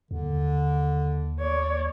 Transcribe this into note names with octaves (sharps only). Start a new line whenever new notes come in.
D#2 D3
C#5 D5